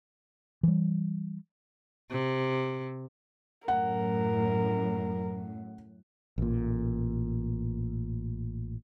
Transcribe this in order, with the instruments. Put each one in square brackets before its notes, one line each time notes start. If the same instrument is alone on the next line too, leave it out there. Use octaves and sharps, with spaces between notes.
[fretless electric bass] E3 G3
[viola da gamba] C3
[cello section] F#2 A2 [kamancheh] A#4 [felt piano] F#5
[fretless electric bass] A1 A#2